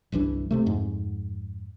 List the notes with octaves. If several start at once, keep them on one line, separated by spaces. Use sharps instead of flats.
G1 C2 E3 D4
E1 C3 A3
F2 G#2